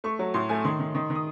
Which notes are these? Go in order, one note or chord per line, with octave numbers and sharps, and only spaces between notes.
A3 C#6
F#3
A2 C6
A3 G#5
D#3 C6
D#3
D#3
D#3
D#6